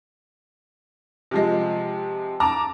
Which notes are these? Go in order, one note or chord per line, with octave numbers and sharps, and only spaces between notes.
C3 F3 G#3
A5 A#5 D6